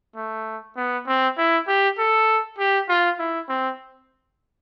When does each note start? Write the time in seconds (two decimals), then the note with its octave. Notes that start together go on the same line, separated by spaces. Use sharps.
0.16 A3
0.76 B3
1.07 C4
1.37 E4
1.67 G4
1.98 A4
2.58 G4
2.89 F4
3.19 E4
3.49 C4